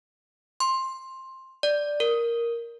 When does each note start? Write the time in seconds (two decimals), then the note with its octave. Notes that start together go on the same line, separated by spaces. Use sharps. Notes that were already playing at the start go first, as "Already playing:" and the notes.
0.60 C6
1.63 D5
2.00 A#4